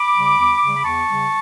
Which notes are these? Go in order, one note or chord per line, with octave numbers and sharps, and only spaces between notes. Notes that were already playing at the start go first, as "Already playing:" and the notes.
Already playing: B5 D6
C#3 G3
E2
C#3 G3
B5
E2 A5 C#6
C#3 G3